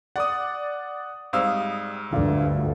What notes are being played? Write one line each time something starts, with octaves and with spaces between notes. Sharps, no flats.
D5 F#5 D6 D#6
G#2 G3 C4 F5 D#6 E6
D2 G2 D3 A3 D4 F4